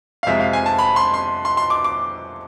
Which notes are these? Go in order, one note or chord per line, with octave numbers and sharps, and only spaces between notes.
F5
F2 C3 G#3 C4 E5
F5
G#5
A5
B5
C6
C6
C6
C6
D6
D6